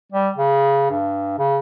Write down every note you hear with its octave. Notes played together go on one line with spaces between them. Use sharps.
G3
C#3
G2
C#3